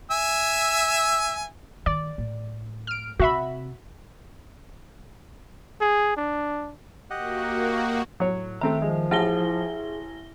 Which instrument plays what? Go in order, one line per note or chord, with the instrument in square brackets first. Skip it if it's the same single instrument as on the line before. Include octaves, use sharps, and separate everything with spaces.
[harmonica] E5 G#5 E6
[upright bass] D#3 [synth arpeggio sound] D5
[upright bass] A2
[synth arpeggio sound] F6 D7
[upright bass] C3 [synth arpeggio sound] F#4 E5 B5
[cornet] G#4
D4
[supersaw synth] A#3 F#4 [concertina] G4 D#5 F#5
[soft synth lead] A2 [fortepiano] F#3 C#5
[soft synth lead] D#3 [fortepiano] A3 C4 A#5 [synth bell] E5
[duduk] F3 [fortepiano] G#3
[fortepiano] A1 F#5 A5 [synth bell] E4 A#6 G7 [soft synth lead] G#4